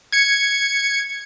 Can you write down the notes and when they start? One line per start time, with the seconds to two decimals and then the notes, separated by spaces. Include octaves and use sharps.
0.13 G#6 C#7